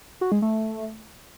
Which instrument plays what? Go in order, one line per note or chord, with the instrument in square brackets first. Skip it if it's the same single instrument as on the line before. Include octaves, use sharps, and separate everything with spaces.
[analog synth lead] F#4
G#3
A3